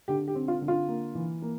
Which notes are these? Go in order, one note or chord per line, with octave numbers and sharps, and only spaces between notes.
D3 G4
G4
C4
F4
D3
F4
A#3
E3
A#3